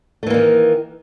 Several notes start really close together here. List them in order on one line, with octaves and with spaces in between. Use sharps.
A3 E3 A#3 D#3